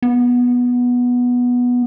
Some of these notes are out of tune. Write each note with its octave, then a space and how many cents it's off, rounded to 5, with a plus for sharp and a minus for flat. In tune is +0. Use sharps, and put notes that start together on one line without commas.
B3 -10